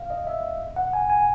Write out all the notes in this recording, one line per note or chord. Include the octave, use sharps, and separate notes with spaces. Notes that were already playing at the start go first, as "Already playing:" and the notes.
Already playing: F5
D#5
E5
F#5
G#5
G#5